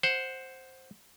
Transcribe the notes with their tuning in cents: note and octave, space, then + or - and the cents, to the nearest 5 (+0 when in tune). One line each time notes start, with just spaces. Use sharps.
C5 +5 F#5 +0